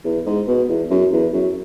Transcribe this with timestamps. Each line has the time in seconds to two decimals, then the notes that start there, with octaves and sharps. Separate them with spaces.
0.04 E2
0.26 G#2
0.48 B2
0.69 E2
0.90 F#2
1.12 E2
1.33 F#2